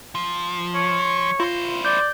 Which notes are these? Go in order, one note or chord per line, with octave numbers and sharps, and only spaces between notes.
F3
C#5
E4 F4 C5
D5 G6